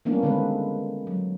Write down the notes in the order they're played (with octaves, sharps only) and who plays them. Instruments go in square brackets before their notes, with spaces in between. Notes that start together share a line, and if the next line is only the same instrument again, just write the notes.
[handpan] E3 G3 A#3 B3 C#4 D4
D3 D#3 G#3 C4 B4
F#3